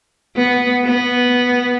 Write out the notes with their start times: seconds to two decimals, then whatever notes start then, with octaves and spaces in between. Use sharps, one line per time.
0.36 B3
0.85 B3